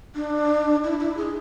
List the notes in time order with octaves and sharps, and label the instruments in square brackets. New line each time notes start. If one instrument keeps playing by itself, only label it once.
[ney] D4
E4
E4
G#4